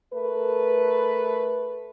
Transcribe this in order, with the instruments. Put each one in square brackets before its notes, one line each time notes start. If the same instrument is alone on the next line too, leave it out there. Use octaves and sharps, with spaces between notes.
[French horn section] A3 A#4 B4